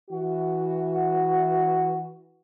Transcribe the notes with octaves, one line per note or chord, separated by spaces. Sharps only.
E3 E4 F#4